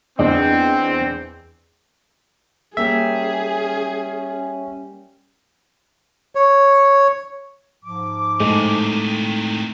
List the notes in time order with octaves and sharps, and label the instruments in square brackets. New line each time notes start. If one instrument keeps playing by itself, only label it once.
[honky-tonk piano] E2 [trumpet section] C4 [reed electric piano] D4 D5 D#5
[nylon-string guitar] G3 A#3 [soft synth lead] C#4 [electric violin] G#4 [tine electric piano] E5
[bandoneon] C#5
[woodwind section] G#2 F3 D6
[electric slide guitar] A2 [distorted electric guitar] C3 D#3 [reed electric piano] G#3 D#4 A4